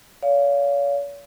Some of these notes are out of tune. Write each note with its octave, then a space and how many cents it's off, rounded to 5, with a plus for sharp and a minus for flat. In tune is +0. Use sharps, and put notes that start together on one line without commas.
C#5 +40 F5 -5